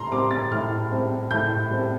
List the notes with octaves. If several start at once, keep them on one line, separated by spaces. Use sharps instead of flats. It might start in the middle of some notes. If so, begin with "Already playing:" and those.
Already playing: A2 G3 A#5 C6
G3 C4 D6
A6
A2 F6
G3 C4
A2 G6
G3 C4